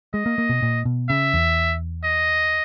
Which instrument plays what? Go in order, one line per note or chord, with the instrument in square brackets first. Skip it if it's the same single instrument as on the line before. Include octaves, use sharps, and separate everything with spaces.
[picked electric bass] G#3 [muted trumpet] D#5
[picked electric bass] A#3
A#3
B2
A#2
B2
[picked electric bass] C#3 [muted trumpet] E5
[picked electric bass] E2
[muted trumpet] D#5